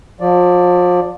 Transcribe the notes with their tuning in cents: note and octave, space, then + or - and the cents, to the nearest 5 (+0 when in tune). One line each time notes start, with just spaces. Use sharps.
F3 +35 D5 +0